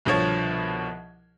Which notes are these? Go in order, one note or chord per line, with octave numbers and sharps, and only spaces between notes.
C2 B2 D3 F3 C#5 G#6